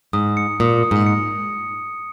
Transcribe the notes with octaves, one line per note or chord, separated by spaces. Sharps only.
G#2 D#6
C#7
A#2 D#6
D#6
G#2
C#7